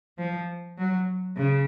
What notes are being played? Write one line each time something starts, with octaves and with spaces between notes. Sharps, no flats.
F3
F#3
C#3